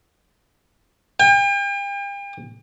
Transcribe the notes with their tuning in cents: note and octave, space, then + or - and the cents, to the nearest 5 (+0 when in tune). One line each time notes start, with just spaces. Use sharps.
G5 +40